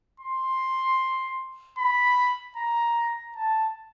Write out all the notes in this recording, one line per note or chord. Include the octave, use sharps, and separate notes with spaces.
C6
B5
A#5
A5